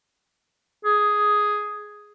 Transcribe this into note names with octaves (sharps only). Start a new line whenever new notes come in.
G#4